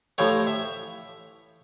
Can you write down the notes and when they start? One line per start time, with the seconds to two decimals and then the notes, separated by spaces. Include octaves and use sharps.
0.18 A2 E3 F3 G4 C#5
0.47 E5